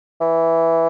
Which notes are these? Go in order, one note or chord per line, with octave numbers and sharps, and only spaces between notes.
E3